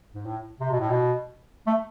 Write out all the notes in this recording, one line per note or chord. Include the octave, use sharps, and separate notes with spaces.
G#2
A2
C3
B2
A2
B2
A3